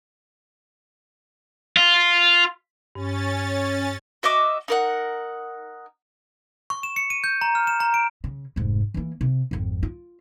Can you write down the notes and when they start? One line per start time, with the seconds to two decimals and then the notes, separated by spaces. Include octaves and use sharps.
1.77 F4
2.95 G2 C#4 A6
4.23 F#4 D#5 E5 D6
4.68 D#4 A#4 F#5
6.70 C#6
6.83 E7
6.96 C#7
7.10 D#7
7.24 G6
7.41 A#5
7.55 F6
7.67 E7
7.80 A#5
7.94 D7
8.24 C#3
8.56 F1 G#2
8.94 E3 A#3
9.21 C3
9.51 G#1 F2
9.83 F4